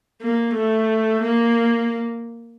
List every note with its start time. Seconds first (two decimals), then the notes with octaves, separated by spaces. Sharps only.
0.20 A#3
0.54 A3
1.22 A#3